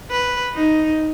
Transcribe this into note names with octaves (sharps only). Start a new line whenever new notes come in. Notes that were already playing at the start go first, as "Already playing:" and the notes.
B4
D#4